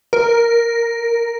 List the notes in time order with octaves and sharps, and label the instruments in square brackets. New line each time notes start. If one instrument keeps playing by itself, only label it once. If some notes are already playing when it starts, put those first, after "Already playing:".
[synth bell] A#4